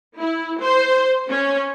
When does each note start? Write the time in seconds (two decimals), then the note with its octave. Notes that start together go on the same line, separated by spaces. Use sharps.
0.18 E4
0.61 C5
1.30 C#4